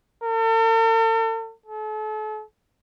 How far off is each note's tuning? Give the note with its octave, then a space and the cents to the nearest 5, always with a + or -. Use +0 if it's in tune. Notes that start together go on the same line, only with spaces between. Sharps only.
A4 +45
A4 -40